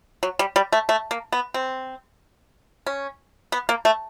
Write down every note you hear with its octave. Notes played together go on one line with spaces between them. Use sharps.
F#3
G3
G3
A3
A3
A#3
B3
C4
C#4
B3
A#3
A3